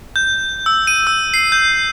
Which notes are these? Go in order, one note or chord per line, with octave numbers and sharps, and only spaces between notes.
G6
E6
D#7
E6
C7
G6